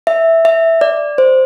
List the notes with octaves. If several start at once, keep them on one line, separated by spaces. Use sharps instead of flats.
E5
E5
D5
C5